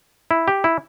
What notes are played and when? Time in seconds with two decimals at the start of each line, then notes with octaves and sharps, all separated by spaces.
0.31 E4
0.48 G4
0.64 E4